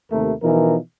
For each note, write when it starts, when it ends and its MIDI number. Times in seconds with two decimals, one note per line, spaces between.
0.12 0.33 39
0.12 0.33 48
0.12 0.33 57
0.12 0.33 70
0.43 0.77 47
0.43 0.77 52
0.43 0.77 53
0.43 0.77 63
0.43 0.77 70